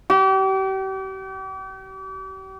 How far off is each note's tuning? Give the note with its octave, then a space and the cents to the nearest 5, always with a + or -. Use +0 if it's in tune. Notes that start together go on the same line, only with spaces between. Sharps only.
G4 -40